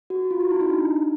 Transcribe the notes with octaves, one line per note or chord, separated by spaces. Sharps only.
F#4
F4
F#4
E4
D#4
D4